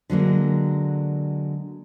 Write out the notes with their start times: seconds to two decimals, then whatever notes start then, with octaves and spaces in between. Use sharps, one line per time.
0.10 D3 F#3 G#3 A#3